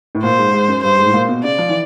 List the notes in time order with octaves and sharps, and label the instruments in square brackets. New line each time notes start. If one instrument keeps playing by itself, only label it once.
[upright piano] A2
[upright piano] A#2 [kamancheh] C5
[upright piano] G#2
G#2
F#2
[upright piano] G2 [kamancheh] C5
[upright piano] G#2
A2
A#2
B2
[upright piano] C#3 [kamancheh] D5
[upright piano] F3
E3